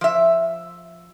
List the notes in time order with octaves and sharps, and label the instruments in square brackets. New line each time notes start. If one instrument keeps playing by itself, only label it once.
[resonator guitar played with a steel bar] F3 E5